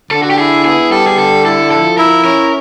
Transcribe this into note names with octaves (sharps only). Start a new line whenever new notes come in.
D3 A4
F#4
G4
E4 G#4
B3 G#4
G3 A4
G#4
D3 A4
E4 A4
F3 A4
E4 A#4
C#4 A#4